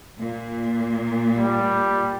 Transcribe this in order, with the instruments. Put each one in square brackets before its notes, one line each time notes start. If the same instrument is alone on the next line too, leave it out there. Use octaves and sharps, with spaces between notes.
[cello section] A#2
[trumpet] G3